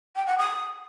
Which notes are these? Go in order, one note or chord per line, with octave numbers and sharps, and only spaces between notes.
G5
F#5
D#6